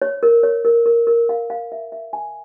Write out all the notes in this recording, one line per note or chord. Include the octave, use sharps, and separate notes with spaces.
C#5
A#4
C#5
A#4
A#4
A#4
F5
F5
E5
E5
G#5